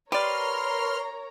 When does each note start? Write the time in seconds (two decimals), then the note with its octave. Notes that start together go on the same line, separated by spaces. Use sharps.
0.12 G4 A#4 B4 C#5 D5 A#5 C6 F6